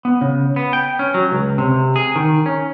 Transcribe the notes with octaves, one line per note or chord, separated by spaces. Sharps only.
B3
C#3
B3
G5
C#4
F#3
C#2
C3
G#4
D#3
C#4